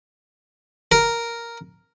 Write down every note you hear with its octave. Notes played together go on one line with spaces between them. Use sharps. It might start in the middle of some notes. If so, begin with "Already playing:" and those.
A#4